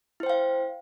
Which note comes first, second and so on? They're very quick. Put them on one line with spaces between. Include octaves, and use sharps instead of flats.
E4 C5 G5 F5